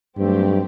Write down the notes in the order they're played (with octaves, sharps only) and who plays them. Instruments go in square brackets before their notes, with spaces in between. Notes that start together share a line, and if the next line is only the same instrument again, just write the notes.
[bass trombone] G2 [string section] D#3 F#3 A3 C4 G4